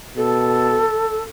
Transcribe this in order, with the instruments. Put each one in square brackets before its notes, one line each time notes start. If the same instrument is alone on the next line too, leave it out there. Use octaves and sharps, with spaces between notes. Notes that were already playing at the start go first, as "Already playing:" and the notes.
[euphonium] B2 [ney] A4